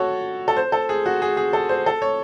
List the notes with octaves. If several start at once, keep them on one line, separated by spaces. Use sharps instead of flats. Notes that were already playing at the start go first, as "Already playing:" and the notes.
Already playing: F#4 A4 C#5
A4
C5
A4
G#4
F#4
G#4
G#4
A4
C5
A4
C#5